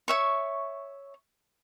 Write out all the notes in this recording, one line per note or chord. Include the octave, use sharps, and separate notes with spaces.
C#5 E5 C#6